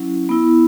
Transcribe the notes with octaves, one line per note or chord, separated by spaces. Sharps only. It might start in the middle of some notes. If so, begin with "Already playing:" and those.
Already playing: F#3 C#4 E4
B3 E4